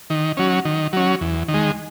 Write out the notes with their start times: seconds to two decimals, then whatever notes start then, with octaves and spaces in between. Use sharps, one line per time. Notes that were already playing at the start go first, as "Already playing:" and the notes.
0.10 D#3
0.37 F#3 C#4
0.65 D#3
0.93 F#3 C#4
1.21 E2
1.48 D#3
1.54 G#3